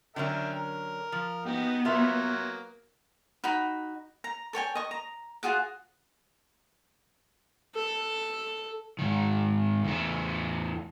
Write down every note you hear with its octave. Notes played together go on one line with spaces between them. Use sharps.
D3 F#3 C#4 A#4 E5 G5
A#4
F3
B3 D#4 F#4 G4
F#3 A#3 F4 E5
D#4 F#4 B5
A#5
A4 C#5 G5 G#5
D#5 C#6
A#5
F4 F#4 G#4 F#5
A4
G#2 D#3
E2 A3